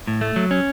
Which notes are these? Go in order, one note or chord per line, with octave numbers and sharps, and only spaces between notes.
A2
A3
F#3
C#4